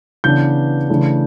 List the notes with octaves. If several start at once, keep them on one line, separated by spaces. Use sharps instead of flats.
C#3 E3 B3 D4 G6
C#3 E3 A3 D4